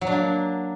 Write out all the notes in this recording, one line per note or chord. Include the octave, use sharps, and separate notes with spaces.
F#3
D4
A#3